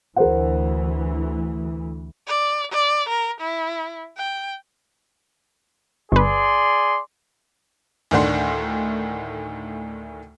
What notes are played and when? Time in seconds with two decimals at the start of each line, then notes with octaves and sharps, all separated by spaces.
0.16 D2 E3 A#4 C5 F#5
2.27 D5
2.72 D5
3.09 A#4
3.40 E4
4.17 G5
6.12 G1 G#4 B4 D5 C6
8.11 D2 A2 D#3 D4 F#5 C6